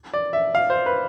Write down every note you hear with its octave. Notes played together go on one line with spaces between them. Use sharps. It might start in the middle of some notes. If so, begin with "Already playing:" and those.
D5
E5
F5
C5
B4